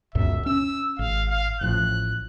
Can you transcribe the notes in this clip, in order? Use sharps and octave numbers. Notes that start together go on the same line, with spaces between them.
C#2 F#2 B2 E5
C#4 E6
G#1 F5
F5
A1 A2 F3 F#6